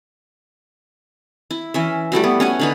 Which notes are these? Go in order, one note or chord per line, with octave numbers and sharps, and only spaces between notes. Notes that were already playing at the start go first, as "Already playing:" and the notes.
E4
E3 C#4 E5
G3 A3 E4 F#4
B3
C#4 F#5 G#5
D3 D#4 B4